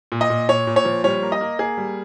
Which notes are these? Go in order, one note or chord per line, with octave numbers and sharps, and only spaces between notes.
A#2
D#5
A#2
A#2 C#5
A#2
C#5
F3
G3 C#5
A#3
D#5
A#3
A#3 G#4
G3